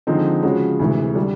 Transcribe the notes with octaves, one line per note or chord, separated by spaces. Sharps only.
D3 F3 G#3 C4 D#4
C#3 F3 G#3 C#4 F#4
D2 C3 E3 G#3
D3 G3